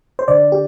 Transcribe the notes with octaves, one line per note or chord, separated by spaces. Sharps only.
C5
D3 D5
G4